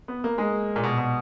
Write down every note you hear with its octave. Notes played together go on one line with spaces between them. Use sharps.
B3
A#3
G#3
A#2
B2
B2